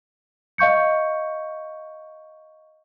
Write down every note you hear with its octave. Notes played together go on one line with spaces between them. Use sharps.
D#5 F5 C#6 G6 C#7